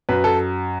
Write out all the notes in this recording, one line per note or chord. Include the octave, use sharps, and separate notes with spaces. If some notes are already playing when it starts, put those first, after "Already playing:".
F#2 B4
A4